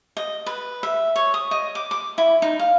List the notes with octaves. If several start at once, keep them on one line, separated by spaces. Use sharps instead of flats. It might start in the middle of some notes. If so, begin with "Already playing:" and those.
D#5
B4
E5
C#5
D#6
D#5
D6
D6
E4
D#4
F5